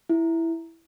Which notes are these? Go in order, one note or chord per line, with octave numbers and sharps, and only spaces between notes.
E4